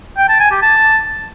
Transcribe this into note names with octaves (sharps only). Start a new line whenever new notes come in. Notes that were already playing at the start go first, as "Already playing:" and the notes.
G5
A5
G#5
G4
A5